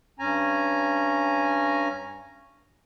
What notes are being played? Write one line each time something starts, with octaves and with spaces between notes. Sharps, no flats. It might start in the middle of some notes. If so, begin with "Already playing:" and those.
G2 C#4 G#5 A#5